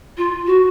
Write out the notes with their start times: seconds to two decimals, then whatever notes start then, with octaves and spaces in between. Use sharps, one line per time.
0.17 F4
0.47 F#4